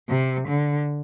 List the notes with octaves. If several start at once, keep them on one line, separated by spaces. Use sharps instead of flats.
C3
D3